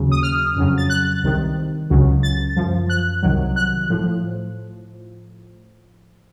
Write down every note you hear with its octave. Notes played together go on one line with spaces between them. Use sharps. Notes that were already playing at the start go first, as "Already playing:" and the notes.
Already playing: D#2 C#3 F#3
D#6
F6
F2 C#3 F#3
A6
F#6
C2 C3 D#3
C#2 C#3 F#3
A6
F#2 F3
F#6
C2 C3 D#3 F#3
F#6
A2 F3